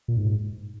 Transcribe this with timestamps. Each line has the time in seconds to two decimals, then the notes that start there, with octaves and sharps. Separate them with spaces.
0.08 A#2
0.17 G#2